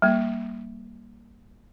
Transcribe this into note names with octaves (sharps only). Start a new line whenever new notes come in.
G3 A#3